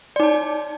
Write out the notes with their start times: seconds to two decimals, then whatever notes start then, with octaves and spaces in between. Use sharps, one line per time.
0.16 D5
0.20 D#4
0.23 A5